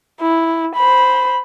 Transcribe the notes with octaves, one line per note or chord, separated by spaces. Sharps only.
E4
C5 B5